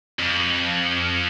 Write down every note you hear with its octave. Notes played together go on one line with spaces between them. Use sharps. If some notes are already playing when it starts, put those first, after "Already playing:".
F2